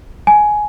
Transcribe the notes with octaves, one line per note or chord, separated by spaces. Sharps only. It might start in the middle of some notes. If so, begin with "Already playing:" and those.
G#5